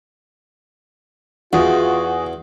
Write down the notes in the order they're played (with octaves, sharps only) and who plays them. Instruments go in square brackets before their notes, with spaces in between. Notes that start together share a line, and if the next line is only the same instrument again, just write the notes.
[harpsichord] E2 [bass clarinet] F4 [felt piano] F#4 G#4